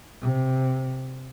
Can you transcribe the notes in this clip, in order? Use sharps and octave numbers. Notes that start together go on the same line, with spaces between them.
C3